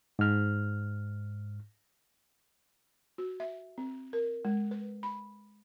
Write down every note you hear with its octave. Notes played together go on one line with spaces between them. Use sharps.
G#2 F6
F#4
E5
C4
A#4
G#3
B4
B5